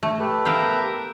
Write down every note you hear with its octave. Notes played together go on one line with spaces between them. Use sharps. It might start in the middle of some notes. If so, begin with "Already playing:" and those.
A3
G4 A4 B4
B3 A#4 E5 F5 G5